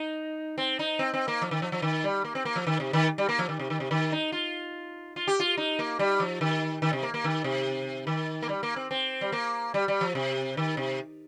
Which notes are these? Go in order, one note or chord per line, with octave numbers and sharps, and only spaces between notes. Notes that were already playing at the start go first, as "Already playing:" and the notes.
Already playing: D#4
C4
D#4
C4
C4
A#3
F3
D#3
F3
F3
D#3
G3
A#3
C4
A#3
F3
D#3
C3
D#3
G3
A#3
F3
D#3
C3
D#3
C3
D#3
D#4
F4
F4
G4
F4
D#4
A#3
G3
F3
D#3
D#3
C3
A#3
A#3
D#3
C3
D#3
A#3
G3
A#3
C4
C4
G3
A#3
G3
G3
F3
C3
D#3
C3